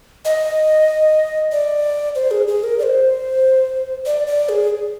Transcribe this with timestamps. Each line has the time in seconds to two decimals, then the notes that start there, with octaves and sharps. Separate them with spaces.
0.25 D#5
1.52 D5
2.15 C5
2.31 G#4
2.48 G#4
2.64 A#4
2.79 D5
2.83 C5
4.06 D5
4.27 D5
4.49 G#4